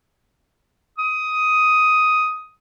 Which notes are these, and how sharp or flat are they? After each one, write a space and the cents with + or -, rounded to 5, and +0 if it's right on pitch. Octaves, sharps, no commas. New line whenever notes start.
D#6 +10